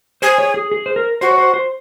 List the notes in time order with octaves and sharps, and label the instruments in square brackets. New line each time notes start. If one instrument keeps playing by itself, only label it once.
[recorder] G#4 [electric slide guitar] C5
[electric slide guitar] C#5
G#4
G#4
C5
A#4
[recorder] F#4 [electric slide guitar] C5
[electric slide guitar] C#5
C5
C5